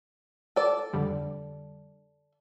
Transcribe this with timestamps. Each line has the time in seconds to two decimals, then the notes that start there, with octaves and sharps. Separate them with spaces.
0.56 A4 D5
0.93 F2 D3 G3